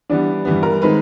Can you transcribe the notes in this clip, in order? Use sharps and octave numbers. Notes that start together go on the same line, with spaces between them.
E3 G3 B3 D4
G2 E3 G3 B3
A#4
D#3 G#3 C4 D#4 B4